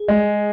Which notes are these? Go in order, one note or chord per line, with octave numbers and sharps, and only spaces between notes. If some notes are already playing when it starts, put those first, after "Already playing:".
Already playing: G#4
G#3